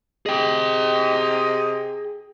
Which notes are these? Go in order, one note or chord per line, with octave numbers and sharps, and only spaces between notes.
C3 G#4 D#5 G5